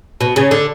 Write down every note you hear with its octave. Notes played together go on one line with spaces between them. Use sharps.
B2
C#3
D3